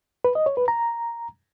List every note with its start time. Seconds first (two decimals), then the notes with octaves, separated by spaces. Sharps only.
0.25 B4
0.35 D#5
0.46 C#5
0.57 B4
0.68 A#5